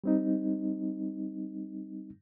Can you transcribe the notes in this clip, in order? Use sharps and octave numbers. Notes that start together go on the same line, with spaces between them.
G3 C4 D#4